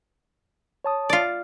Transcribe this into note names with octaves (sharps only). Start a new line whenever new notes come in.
C#5 A5 D#6
F4 D5